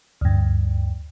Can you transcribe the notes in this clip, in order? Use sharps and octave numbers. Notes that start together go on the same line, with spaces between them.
D2 G2